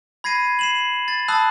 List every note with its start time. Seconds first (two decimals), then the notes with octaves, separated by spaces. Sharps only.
0.24 B5 G#6 A#6 C7 D#7
0.59 C7 E7 F#7
1.08 A6
1.28 A5 B5 D#6 E6 F#6